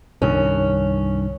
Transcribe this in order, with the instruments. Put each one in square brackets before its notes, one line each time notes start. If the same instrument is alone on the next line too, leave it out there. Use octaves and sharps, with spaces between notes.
[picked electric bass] C2 G2 D#3 [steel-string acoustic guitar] C#4